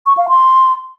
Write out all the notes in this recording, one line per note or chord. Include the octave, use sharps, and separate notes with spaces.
C#6
F5
C6